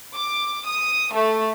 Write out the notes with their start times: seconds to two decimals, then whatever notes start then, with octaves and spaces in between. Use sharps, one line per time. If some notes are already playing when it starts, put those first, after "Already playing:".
0.14 D6
0.66 D#6
1.12 A3